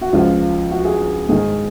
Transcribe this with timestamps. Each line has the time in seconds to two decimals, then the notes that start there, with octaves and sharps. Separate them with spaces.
0.01 F#4
0.13 C#2 C#3 F3 F4
0.71 F#4
0.85 G#4
1.29 G#2 D#3 G#4